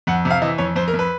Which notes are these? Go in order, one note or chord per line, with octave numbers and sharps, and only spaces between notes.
F2 F#5
C3
F5
E3 D#5
F2 C#5
F2 C5
A#4
F2
B4